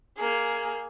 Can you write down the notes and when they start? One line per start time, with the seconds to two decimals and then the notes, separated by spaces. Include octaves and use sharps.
0.17 A#3 G#4